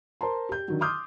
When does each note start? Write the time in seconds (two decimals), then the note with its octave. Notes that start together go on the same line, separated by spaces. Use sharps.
0.21 A#4 C5 A5 A#5 C6
0.49 G4 G6
0.68 D3 D#3 F#3
0.81 C6 D6 D#6 F6 G6